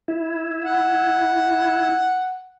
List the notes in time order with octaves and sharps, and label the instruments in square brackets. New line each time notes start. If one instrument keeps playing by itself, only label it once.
[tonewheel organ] E4
[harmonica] F#5